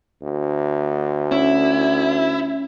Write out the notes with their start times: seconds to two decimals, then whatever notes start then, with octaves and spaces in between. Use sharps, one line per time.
0.23 D2
1.32 C#4 E4